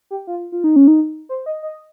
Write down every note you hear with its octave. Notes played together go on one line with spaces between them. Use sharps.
G4
F4
F4
D#4
C#4
D#4
C5
D#5
D#5